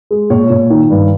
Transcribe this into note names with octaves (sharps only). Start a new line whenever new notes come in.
G#3
A#2 C#5
A#2
D#3
G2